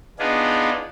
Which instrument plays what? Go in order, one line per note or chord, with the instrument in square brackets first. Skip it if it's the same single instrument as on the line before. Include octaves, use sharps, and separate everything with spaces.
[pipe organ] B3 D4 D#4 F4 G#4